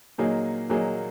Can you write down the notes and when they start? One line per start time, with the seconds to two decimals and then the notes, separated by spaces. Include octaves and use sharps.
0.18 A#2 F#3 A#3 D#4 G#4
0.69 A#2 F#3 A#3 D#4 G#4